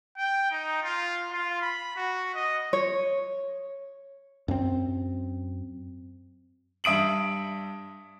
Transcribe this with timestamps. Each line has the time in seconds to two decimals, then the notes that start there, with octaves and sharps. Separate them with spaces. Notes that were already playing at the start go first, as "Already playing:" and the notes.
0.17 G5
0.51 D#4
0.83 F4
1.31 F4
1.62 B5
1.96 F#4
2.35 D#5
2.73 C#5
4.48 F#2 C4
6.84 G2 E5 D#6 D7 F#7